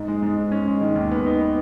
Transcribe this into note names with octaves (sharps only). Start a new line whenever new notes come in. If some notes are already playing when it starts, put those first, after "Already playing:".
Already playing: G#2 D#4
G#3
G#2
G#2
C#4
G#3
D#3
D#2
B3
D#4
B3